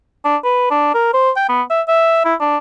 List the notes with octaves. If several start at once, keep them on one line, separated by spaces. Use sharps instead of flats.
D4
B4
D4
A#4
C5
G5
B3
E5
E5
E4
D4